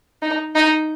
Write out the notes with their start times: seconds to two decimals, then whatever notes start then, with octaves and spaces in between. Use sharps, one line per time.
0.22 D#4
0.55 D#4